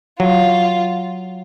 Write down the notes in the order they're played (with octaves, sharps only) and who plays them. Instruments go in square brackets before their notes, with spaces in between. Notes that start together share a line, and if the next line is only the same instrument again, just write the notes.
[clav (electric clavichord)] F#3 [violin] F4